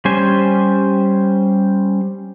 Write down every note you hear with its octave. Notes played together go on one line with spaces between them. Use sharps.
G3 C#4 C5 G#5